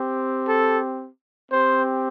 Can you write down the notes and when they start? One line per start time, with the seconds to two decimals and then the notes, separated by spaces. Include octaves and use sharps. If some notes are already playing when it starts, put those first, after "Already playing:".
Already playing: C4 G4
0.45 A4
1.50 C4 G4 C5